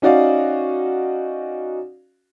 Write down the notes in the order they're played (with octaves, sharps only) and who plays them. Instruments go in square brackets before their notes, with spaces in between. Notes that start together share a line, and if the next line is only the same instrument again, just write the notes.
[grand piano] C#4 D#4 F#4 D5 F5